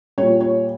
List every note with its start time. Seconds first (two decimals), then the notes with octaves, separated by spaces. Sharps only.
0.18 A#2 G3 C#5
0.40 C#5